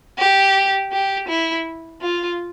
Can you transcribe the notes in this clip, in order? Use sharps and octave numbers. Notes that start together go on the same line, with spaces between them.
G4
G4
E4
F4